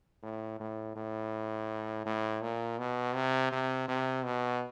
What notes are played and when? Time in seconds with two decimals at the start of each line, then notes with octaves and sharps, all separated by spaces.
0.23 A2
0.60 A2
0.96 A2
2.06 A2
2.41 A#2
2.78 B2
3.15 C3
3.52 C3
3.88 C3
4.24 B2